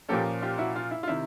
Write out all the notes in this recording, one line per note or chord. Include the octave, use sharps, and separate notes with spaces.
A#2 F3 A#3 C#4 G4 A4
F4 G4
E4 F#4
F4
E4
F4
C3 D#3 E4